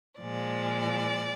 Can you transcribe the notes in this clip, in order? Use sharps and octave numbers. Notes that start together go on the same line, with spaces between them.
A#2 F3 G#3 D5